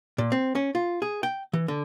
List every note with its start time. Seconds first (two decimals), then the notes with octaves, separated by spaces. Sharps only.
0.18 A#2
0.32 C4
0.55 C#4
0.75 F4
1.02 G#4
1.23 G5
1.53 E3
1.68 D3